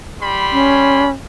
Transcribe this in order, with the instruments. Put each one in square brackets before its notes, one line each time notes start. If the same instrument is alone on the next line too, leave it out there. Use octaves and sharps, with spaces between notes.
[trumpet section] G3 B5 C6
[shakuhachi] C#4